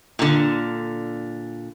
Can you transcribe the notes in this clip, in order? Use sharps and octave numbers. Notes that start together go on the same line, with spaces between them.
A#2 D3